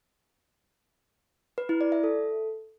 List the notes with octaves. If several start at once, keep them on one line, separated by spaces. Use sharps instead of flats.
B4
E4
D5
E5
A4